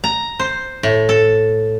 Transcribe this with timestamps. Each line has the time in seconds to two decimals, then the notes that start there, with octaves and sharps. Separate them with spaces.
0.04 A#5
0.39 C5
0.83 A2
1.09 A4